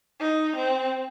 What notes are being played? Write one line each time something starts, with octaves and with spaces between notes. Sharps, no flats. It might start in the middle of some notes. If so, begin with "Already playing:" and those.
D#4
C4